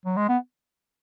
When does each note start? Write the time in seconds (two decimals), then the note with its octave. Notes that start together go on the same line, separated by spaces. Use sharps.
0.05 F#3
0.17 G#3
0.29 B3